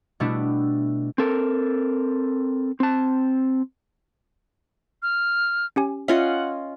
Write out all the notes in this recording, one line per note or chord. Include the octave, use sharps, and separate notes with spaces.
B2 G3 A3 B3 D4 E4
C4 A4 A#4
C4 A5
F6
C#4 G4 G#5
C#4 F4 D#5 E5 F#5